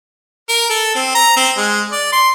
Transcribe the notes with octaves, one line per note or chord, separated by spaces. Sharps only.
A#4
A4
C4
A#5
C4
G#3
D5
C6